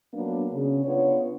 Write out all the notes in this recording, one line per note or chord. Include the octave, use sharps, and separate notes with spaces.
F#3 A#3 B3 D4
C#3
B3 D4 F4 C#5